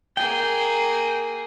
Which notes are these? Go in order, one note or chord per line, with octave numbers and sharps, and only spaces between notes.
A#3 G#4 G5